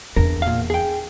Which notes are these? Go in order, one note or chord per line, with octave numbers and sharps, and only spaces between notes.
E2 D4 A#4
A#2 F5
G#4 G5